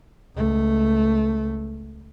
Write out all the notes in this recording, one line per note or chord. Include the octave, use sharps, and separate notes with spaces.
C#2 A3